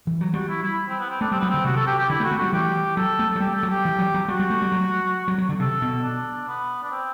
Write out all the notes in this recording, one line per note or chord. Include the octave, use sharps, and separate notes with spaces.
E3
F#3
G3 F#4
E4
E4
C4
B3
C4
A3 D4
G3 C4
F#3 B3
D3 C4
C3 F#4
A4
G4
G4
D3 E4
A3
F#4
A3
G3 F#4
E3 G4
F#3 A4
A3
A4
F#3
G3 G4
A4
F#3
G4
E3
F#3
F#3
G3 F#4
G3
A3
G3
F#3
F#3
F#3
D3
C3 A4
B2
D4
B3
D4
C4